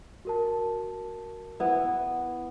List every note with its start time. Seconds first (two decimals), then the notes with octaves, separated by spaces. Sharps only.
0.25 F#4 A#4 A5
1.60 B3 E4